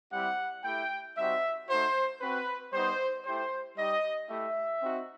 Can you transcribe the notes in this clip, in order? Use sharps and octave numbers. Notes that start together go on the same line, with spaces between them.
G3 C4 E4 G4 F#5
A3 E4 G4 G5
G3 C4 D#4 F#4 E5
A3 D#4 F#4 C5
C4 F#4 B4
G3 B3 D#4 C5
A3 E4 G4 C5
G3 D#4 G4 D#5
A3 E4 G4 E5
C4 D#4 F#4